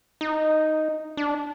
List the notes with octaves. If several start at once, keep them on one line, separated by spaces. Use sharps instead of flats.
D#4
D4